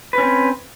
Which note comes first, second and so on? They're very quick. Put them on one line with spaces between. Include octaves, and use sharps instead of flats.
B4 C#4 C4